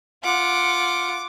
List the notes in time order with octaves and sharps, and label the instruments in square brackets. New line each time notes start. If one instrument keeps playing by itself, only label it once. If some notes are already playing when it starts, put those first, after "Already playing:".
[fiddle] F4 F#5 [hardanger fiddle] D6